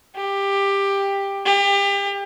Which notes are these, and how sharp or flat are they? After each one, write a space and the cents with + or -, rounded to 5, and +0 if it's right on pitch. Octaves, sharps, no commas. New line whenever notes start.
G4 +15
G4 +30